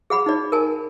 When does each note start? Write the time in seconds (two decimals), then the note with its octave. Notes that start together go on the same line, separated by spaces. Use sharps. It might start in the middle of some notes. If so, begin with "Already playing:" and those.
0.10 G#4 F#5 B5
0.26 D#4 D5
0.52 A#4 G#5 A5